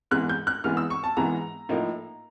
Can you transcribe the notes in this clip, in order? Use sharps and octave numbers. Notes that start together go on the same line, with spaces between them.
G#2 E3 G#3 B3 F#6
G6
F#6
G#2 E3 G#3 B3 F6
E6
C#6
A5
G#2 E3 G#3 B3 A#5
A2 F3 A#3 D#4